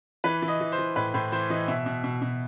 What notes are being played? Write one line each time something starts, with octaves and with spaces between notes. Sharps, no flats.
E3 B4
E3
D#5
E3
C5
E3
A2 B4
A2 C5
E3 C5
E3 D#5
B2 E5
B2
B2
B2